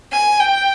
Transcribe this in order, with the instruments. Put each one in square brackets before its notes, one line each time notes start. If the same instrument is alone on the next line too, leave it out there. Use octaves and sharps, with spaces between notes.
[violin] G#5
G5